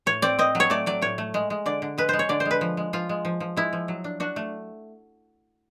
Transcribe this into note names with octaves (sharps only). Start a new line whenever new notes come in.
A2 C#5
C4 D5
C4 D#5
F#3
C#5
A3 D5
F#3 D5
A2 C#5
A3
G#3
G#3
D3 D5
D3
G#3 B4
G#3 C5
C#5
D3 D5
C5
G#3
B4
F3
G#3
F3 F4
G#3
F3
F3
G#3 E4
F3
F#3
D4
D4 F#4
A3